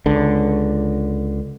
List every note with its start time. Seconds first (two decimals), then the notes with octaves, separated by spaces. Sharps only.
0.06 C#2 D3